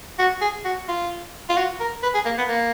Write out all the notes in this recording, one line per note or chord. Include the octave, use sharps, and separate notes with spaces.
F#4
G#4
F#4
F4
F4
F#4
A#4
B4
G#4
A#3
B3
A#3